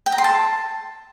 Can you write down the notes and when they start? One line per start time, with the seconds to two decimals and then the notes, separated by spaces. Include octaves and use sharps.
0.06 G5
0.12 A#5
0.18 C6
0.24 A5